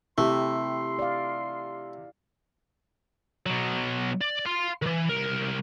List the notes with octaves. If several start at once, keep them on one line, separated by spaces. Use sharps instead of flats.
C3 A3 E4 G4 C6
D5 F5
B2 F#3
D5
F5 C6
D#3 E3
C2 A#4